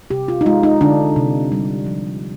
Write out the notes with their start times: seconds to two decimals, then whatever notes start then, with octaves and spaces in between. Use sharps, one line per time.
0.10 C3 G4
0.28 F4
0.41 D#4
0.46 G#3 F4
0.63 D#4
0.81 D3 D4
1.16 C3
1.52 G3
1.86 F3